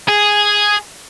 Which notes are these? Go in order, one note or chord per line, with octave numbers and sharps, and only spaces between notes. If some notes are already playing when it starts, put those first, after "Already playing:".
G#4